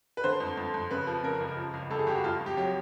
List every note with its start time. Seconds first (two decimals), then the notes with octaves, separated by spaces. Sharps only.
0.17 B4
0.24 D3 C5
0.40 F2
0.57 F2
0.74 F2
0.91 C#3 B4
1.07 F3
1.23 C#3 A#4
1.41 C#2
1.57 F3
1.74 C#2
1.91 C#2 A4
1.99 G#4
2.07 C#2 G4
2.16 F#4
2.24 F2 F4
2.41 F2
2.46 G4
2.57 F#3 G4